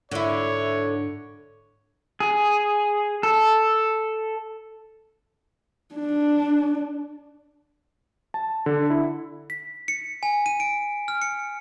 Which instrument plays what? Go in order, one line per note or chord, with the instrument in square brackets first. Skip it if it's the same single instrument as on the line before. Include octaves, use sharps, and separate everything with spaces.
[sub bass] G#2 [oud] D3 E4 [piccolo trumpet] C#5
[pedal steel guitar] G#4
A4
[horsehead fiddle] D4
[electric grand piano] A5
D3
E4
[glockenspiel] B6
C#7
G#5
D#7
D7
F6
C#7